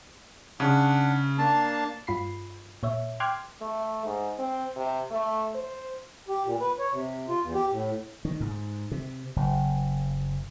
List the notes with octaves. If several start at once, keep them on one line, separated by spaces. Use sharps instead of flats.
C#3 D4 F#5
A#3 D4 A5
G2 F4 B5 C7
A#2 C#5 E5
G5 C6 D6 F6 F#6 G#6
A3
G#2
C4
C3
A3
C5
G4
A#2
B4
C#5
C3
F4
E2
G4
A2
D#3
G#2
C3
F#1